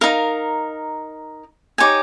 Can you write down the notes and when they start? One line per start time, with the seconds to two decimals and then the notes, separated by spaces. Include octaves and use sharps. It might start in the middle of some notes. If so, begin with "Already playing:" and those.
0.01 D#4 A#4 F5
1.78 D#4 G4 C#5 G#5